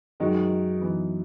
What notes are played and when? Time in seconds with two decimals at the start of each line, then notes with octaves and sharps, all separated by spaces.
0.20 F#2 D#3 G#3 D#4 F#4
0.81 E3 B3 D#4